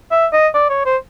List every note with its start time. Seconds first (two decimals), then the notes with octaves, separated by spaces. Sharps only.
0.11 E5
0.33 D#5
0.54 D5
0.69 C#5
0.85 C5